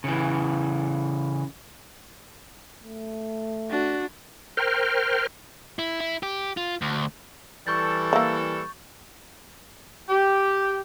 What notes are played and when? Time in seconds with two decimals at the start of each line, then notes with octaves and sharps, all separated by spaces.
0.04 C#3 E3
2.83 A3
3.70 D4 F#4
4.57 A#4 C5 G5 F6
5.79 E4
6.00 E4
6.23 G4
6.57 F4
6.82 D2
7.67 E3 G3 A4 C#6 G6 A6
8.13 A#3 E4
10.10 G4